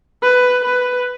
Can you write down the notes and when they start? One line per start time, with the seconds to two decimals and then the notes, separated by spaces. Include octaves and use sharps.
0.23 B4
0.65 B4